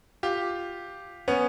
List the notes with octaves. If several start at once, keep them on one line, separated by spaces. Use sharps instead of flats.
F4 G4
B3 C#4